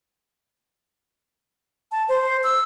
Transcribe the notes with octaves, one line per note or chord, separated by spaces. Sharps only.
A5
C5
E6